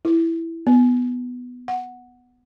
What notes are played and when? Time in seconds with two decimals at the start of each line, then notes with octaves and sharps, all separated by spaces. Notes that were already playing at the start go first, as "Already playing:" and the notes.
0.05 E4
0.67 B3
1.68 F#5